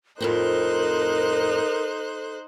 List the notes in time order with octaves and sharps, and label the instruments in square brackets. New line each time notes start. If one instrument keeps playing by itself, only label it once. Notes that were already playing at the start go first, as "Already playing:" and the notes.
[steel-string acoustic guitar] F2 A2 C4 [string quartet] D#4 C5 F#6 [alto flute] A4 [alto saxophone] A#4